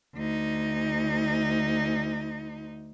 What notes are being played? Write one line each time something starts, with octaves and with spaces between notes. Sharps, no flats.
D2 D#4